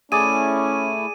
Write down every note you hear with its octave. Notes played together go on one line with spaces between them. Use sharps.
A3 C#4 E4 G#4 D5 D#7